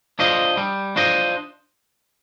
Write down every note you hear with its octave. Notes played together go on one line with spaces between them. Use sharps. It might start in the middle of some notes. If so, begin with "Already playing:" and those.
D4 F4 C5 D#5
G3
D4 F4 C5 D#5